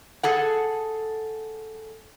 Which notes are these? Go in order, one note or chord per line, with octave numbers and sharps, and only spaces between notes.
G#4 A4 F#5